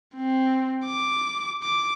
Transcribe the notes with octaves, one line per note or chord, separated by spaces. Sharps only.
C4
D6
D6